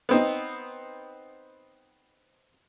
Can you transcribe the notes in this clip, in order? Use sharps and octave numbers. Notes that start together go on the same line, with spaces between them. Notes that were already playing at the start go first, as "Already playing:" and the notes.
B3 C4 D#4